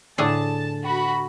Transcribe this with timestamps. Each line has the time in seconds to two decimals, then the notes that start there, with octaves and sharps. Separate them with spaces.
0.18 A2 D3 G#4 A5
0.84 F#4 B5